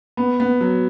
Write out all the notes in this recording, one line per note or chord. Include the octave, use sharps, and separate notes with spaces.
B3
B3
F#3